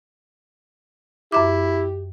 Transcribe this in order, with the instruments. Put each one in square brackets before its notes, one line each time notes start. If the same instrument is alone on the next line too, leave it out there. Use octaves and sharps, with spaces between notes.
[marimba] F#2 E5 D6 [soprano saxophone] E4 [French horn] G4